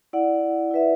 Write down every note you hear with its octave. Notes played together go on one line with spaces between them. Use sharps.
E4 D5 F#5
E4 B4 E5